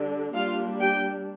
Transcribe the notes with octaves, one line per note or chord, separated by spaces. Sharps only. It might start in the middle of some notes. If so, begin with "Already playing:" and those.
Already playing: D3 G3 D4
G3 A#3 D4 F4 F5
G4 G5